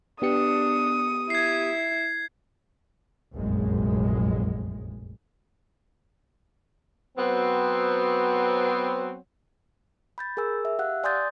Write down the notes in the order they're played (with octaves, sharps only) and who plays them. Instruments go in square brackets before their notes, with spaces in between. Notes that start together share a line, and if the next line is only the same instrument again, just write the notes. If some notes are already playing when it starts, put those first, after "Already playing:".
[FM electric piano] B3 G4 C#7 [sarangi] D4 [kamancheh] D#6
[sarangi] E4 [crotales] G#6 C7
[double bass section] F1 A#1 F#2 G#3
[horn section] F#3 B3 C4
[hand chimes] B5 G6 A6
G#4 A#4 G#5 E6
E5
G4 F5 F#5 E6 F#6
D5 G#5 C6 D#6 G6 A6